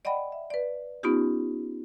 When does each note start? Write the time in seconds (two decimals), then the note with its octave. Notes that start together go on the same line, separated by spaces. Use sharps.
0.05 D5 D#5 F#5 G5 B5
0.32 E5
0.50 B4 D5
1.03 B3 C#4 D#4 F4 G4